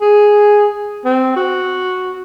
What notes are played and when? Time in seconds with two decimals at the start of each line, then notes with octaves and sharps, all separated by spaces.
0.01 G#4
1.05 C4
1.36 F#4